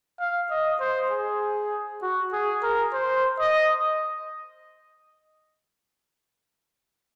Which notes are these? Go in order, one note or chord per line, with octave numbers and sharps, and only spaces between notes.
F5
D#5
C5
G#4
F#4
G#4
A#4
C5
D#5